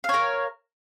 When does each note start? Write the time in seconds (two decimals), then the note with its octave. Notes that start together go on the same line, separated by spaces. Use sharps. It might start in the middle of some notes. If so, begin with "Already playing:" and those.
0.04 F5
0.09 C#5
0.14 A#4